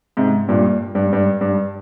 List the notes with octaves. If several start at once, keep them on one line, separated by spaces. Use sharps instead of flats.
G#2 C3
G2 A#2
G2
G2
G2